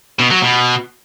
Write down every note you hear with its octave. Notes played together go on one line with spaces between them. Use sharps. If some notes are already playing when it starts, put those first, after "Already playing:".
B2
F#3
B2